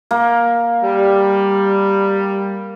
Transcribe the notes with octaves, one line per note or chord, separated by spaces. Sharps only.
A#3
G3